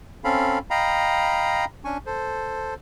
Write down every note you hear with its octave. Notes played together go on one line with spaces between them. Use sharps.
C4 C#4 A4 F5 B5
D#5 F5 G5 A#5 B5
C#4 D4 G#5 C#6
A4 C5